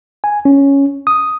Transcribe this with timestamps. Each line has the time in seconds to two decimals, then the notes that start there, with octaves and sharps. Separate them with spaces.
0.24 G#5
0.45 C#4
1.07 D#6